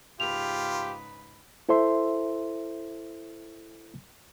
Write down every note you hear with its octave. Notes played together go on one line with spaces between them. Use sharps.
G#2 C#3 F4 G4 B4 F7
E4 A4 C5 E5 C6